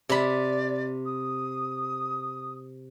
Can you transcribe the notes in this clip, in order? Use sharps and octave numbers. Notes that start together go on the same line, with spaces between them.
C3 D5 B5
D#6